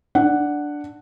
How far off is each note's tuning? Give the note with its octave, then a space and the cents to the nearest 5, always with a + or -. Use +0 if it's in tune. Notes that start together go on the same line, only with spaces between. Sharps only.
D4 +0 F#5 +0